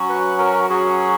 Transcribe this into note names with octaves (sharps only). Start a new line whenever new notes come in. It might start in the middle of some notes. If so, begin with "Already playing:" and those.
Already playing: F#3 C#4 F#4
B4
A#4
F#3 C#4 F#4 G#4